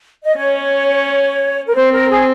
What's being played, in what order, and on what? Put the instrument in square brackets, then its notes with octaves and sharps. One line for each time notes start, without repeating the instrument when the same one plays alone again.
[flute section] D#5
[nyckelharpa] C#4 [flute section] C#5
[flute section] A#4
[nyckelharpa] C4 [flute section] C5
[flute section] A#4
G#4